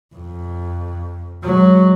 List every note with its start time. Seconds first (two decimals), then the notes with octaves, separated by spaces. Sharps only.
0.16 F2
1.44 F#3 G#3